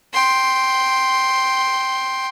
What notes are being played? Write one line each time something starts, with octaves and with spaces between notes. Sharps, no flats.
G5 C6